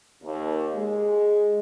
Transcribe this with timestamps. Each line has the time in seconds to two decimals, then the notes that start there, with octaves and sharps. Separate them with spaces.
0.22 D#2
0.75 G#3